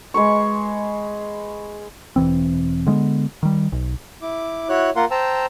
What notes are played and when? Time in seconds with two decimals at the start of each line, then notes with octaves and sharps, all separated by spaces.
0.14 G#3 B4 C#6
2.16 E1 C#2 E3 C4
2.87 D3 G#3 A#3 B3
3.43 D#3 G3
3.72 B1
4.22 E4 D6
4.69 E4 F#4 C#5 F#6
4.96 A#3 F4 A#4 F#5 C6
5.11 C5 G5 A5 A#5 E6